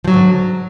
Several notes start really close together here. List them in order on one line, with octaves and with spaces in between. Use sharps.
F3 F#3 G#2 D3